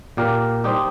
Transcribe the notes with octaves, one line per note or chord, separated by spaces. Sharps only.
A#2 A#3 G4 A#4
G3 D#4 G4 C5